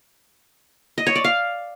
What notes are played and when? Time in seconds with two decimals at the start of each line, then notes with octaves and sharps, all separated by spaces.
0.98 D#5
1.07 C#5
1.16 D5
1.24 F5